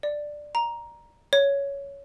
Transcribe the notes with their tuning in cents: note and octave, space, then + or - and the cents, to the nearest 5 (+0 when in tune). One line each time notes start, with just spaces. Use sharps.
D5 +10
A#5 +10
C#5 +10